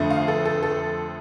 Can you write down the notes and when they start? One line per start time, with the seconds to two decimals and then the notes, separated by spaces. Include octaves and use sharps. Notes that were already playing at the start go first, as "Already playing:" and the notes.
Already playing: F2 D3 A3
0.10 F5
0.28 A4
0.45 A4
0.63 A4